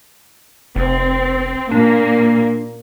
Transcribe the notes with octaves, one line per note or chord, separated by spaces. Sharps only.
F1 C4
A#2 A#3 D4